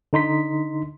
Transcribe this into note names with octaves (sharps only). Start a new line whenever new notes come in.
D3 D#4 C6 B6